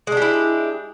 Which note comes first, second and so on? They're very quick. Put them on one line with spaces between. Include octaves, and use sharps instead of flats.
G#3 D4 G4 E4